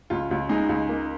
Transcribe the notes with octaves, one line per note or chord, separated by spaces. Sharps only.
C#2 F4
C#2
G#3 D#4
C#2
A#3